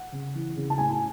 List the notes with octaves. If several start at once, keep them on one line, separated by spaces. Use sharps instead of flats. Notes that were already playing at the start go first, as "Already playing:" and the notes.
Already playing: F#5
C#3
E3
C#3
A5
A2 G#5
G#5